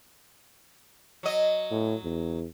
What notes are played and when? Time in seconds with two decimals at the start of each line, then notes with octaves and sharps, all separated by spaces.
1.23 F#3 D#5
1.71 A2
2.04 E2